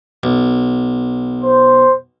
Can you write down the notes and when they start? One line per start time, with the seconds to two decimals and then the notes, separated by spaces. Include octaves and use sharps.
0.23 B1
1.43 C5